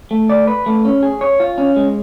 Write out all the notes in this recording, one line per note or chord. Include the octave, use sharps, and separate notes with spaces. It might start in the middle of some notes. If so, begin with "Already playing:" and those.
A3
D5
B4
A3
C#4
G#4
C#5
F4
C#4
G#3